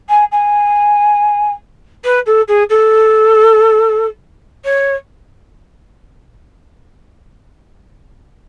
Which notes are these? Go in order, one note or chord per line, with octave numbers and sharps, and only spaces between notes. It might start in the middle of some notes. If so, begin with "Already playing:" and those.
G#5
G#5
B4
A4
G#4
A4
C#5